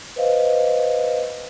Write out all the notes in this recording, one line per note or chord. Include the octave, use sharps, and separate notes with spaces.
B4 C5 D#5 F5